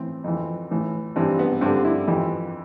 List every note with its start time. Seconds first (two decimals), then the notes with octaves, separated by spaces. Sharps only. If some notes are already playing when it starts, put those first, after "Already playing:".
Already playing: A2 E3 C4
0.24 F2 E3
0.71 A2 E3
1.16 G2 E3 C4
1.39 B3
1.61 G2 D3 C4
1.84 E4
2.07 F2 E3 G4